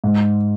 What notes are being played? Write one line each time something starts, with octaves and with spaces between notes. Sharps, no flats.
G#2